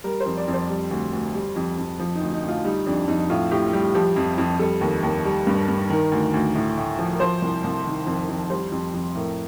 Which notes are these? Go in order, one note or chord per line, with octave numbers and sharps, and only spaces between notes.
G3 A#4
C5
F2
D5
F2
C5
G3
D2
D2
G3
F2
F2
F3
D#4
D2
D#4
D2
F4
G3 D#4
F2 D4
F2 D#4
A2 F4
A2 G4
G3 G4
F3 G4
F2
F2
G3 A4
D#2
D#2
G3
G2
G2
D#3 A#4
D2
D2
A2
A2
F3
A#4
F3 C5
C2
C2
D#3
F2
F2
G3 C5
F2
F2
A2 A#4